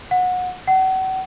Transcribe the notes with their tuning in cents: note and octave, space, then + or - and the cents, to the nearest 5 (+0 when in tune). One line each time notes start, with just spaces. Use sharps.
F#5 -25
F#5 +35